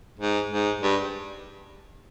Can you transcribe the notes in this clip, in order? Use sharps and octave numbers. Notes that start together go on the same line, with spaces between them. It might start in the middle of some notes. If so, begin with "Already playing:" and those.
G#2
G#2
G2